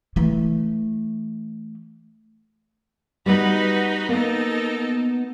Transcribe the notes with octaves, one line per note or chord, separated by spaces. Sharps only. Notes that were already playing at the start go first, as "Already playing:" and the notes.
E3 A3
G3 B3 D#4 F#4 B4
A#3 B3 D#4 A4 A#4